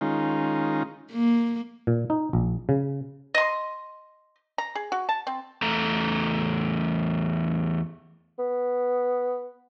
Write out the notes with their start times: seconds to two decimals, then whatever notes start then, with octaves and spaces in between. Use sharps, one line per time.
0.01 D#3 G#3 C#4 D#4 F4
1.11 A#3
1.87 A#2
2.10 D#4
2.33 A#1
2.69 C#3
3.34 D#5 C6
4.58 A#5
4.75 G#4
4.92 F#4
5.09 A5
5.27 C4
5.62 E2 A3 A#5
8.39 B3